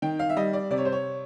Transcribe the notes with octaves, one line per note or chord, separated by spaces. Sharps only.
D#3 G5
F5
E5
G3 D#5
D5
C3 D5
C#5
C5
C#5